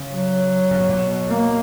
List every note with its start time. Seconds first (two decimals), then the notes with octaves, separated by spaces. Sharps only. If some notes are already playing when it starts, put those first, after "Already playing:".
Already playing: C#3
0.13 F#3
0.71 C#3
0.80 B2
0.89 A#2
0.97 B2
1.28 A#3